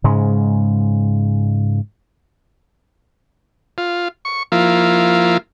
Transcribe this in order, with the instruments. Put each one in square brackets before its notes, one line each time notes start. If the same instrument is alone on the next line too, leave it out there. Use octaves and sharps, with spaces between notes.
[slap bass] G#2 C#3 G#3
[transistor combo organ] F4
C#6
F3 A#3 E4 F4